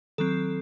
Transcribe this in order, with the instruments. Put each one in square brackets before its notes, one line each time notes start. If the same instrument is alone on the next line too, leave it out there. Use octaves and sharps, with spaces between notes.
[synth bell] D#3 F#3 C4 A4